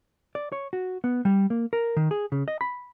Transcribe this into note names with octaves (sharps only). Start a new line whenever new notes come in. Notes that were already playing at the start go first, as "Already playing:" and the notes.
D5
C#5
F#4
B3
G3
A#3
A#4
D#3
G#4
C#3
D#5
B5